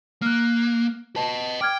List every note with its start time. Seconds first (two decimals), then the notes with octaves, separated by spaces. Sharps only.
0.22 A#3 F6 F#6
1.16 B4 D#5 A5
1.61 G5 D6 F6 G#6